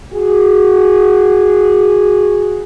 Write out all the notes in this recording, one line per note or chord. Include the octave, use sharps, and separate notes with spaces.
F#4 G#4